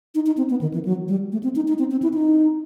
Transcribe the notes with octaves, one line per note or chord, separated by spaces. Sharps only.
D#4
D#4
C4
B3
D#3
E3
F#3
G3
A3
C4
D#4
D#4
C4
C4
E4
D#4